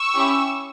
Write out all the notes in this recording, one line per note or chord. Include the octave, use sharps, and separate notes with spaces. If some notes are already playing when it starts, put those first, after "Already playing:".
Already playing: C#6 E6
C#4 E4 G4